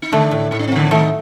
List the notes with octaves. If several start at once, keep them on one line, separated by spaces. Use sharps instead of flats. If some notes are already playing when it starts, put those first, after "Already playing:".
D#4
D3 A3 D4
A2
A2 D#4
D4
C4
D3 F#3 D4
D#3 A3 D#4